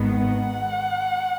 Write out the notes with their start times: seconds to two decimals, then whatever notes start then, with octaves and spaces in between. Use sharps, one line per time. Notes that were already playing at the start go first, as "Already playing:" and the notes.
Already playing: G#1 G#2 D#3 B3
0.10 F#5